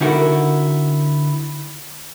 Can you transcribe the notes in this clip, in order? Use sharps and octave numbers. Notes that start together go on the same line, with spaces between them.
D3 D#4 E4 F#4 A4 A#4